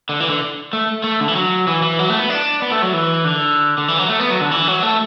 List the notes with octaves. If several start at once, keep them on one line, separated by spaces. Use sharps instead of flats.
D3
E3
D3
A3
A3
D3
E3
F#3
E3
E3
F#3
A3
B3
D4
B3
A3
F#3
E3
D3
D3
E3
F#3
A3
B3
F#3
D3
E3
F#3
A3